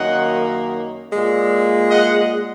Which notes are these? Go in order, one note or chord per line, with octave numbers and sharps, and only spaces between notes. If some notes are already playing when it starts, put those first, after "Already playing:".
Already playing: F#2 D#3 A#3 D#5 F#5
A#2 G#3
D#5 F#5